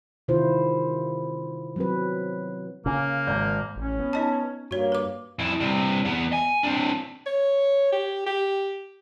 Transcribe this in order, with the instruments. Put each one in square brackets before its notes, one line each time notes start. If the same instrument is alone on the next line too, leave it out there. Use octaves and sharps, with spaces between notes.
[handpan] C3 D#3 E4 F4 C5
F#3 C4 B4
[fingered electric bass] C#3 [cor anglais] A#3
[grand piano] G#1 G6
[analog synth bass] A1 [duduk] C#4
[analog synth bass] B3
[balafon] D#4 D#5 A5
[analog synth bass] G2 [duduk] A#3 [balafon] F#4 C#5
[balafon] B4 D6
[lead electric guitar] F2 E4
G2 C3
E2 B3
G#5
C4 D4
[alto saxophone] C#5
G4
G4